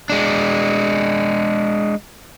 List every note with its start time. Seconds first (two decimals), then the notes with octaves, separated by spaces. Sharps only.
0.10 G#3 D4